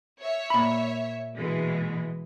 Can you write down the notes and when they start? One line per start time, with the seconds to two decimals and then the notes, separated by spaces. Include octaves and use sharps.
0.22 C#5 E5
0.50 A#2 B5
1.36 B2 E3 G#3